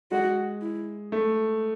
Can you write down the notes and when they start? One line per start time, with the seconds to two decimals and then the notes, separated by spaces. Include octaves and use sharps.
0.11 G#3 F#4
0.62 E4
1.12 A3